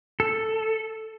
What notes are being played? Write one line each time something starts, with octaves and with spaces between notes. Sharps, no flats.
A4